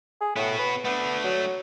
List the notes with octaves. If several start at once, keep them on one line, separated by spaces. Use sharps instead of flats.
G#4
A2 B3 F#4
B4
A3 B3 D4
F#3